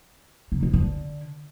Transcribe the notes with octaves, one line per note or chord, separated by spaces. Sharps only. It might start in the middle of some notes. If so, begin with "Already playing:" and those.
C3
B2
D3